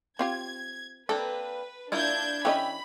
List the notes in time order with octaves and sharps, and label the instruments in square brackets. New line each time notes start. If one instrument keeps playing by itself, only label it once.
[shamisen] C4 F4 G4 [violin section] G#6
[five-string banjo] A#3 C4 D4 [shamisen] A4 [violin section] B4
[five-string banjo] A#3 E4 F4 [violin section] D4 G6 G#6
[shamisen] E3 C#4 D#5 [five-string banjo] G4 B4 E5 [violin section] B5